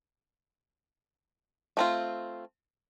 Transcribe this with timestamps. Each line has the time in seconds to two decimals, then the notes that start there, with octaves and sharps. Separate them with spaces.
1.77 A3 C4 F4